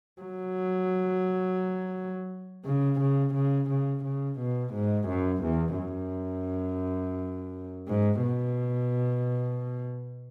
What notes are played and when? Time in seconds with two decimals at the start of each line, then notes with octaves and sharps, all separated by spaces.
0.21 F#3
2.65 C#3
3.01 C#3
3.35 C#3
3.70 C#3
4.05 C#3
4.40 B2
4.74 G#2
5.09 F#2
5.44 E2
5.79 F#2
7.88 G#2
8.23 B2